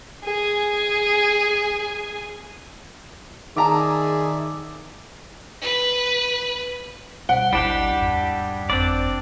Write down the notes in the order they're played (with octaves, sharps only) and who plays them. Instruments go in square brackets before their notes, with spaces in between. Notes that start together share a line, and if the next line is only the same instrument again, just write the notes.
[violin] G#4 G#5
[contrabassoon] D#3 [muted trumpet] G#4 [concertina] D5 E5 [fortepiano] A5 A#5 D6
[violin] B4
[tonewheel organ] B2 G3 C5 [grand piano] F#5
[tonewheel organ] G#1 D2 E4 [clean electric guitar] G3 D4 G4
[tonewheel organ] E2 G#2
[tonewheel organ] G1 F2 [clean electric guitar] C4 D4 D5